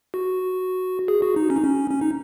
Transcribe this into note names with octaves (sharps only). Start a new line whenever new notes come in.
F#4
G#4
F#4
D#4
C#4
D#4
C#4
C#4
D#4